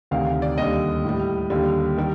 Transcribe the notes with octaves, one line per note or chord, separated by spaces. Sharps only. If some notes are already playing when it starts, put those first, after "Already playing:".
D2 C3 D#3 F5
F5
D5
D#2 D3 G3 D#5
A2
G3
D#2 D3 G3
D#3 G3